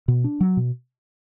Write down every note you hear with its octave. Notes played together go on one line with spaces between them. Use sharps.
B2
D4
F#3
B2